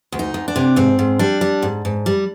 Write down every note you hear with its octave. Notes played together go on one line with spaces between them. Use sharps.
D2
D#4
D2
D4
C3
G#2 C4
G#2
G3 D4
G3
G#2
G#2
G3